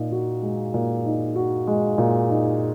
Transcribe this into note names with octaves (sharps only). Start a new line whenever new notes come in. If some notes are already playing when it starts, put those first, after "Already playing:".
Already playing: A#2 D#4
F#4
G#3
A#2
D#4
F#4
G#3
A#2
D#4